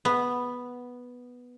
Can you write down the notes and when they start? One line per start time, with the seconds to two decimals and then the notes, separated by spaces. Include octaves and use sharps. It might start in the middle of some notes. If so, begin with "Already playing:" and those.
0.05 B3